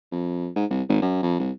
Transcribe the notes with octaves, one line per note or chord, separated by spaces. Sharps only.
F2
G#2
C2
G#1
F#2
F2
C2